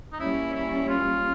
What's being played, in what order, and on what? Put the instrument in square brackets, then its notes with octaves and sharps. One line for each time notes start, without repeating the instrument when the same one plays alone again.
[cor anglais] D#4
[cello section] G3 A#3 C#4 [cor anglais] E4
[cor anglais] E4
F4